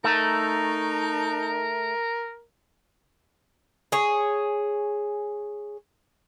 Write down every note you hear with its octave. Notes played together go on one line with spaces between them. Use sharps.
A3 D#4 A#4
G#4 C#5